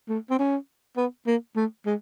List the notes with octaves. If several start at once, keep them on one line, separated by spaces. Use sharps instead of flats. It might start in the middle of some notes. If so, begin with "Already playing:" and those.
A3
C4
C#4
B3
A#3
A3
G#3